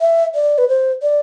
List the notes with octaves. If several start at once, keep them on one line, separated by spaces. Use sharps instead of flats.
E5
D5
B4
C5
D5